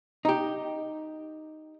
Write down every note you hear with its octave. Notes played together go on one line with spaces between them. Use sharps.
D#4 G4